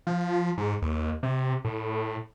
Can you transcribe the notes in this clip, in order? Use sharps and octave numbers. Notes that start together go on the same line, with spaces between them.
F3
G#2
D#2
C3
A2